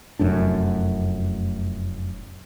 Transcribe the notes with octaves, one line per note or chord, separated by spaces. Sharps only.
F1 F#2 A2 D4